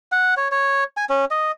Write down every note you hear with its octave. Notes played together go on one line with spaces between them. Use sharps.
F#5
C#5
C#5
G#5
C#4
D#5